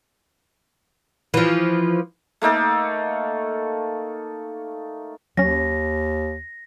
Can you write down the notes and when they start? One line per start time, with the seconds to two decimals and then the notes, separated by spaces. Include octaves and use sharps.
1.34 E3 F3
2.42 A3 A#3 D#4 A4
5.37 D#2 F#3 C#4 A#6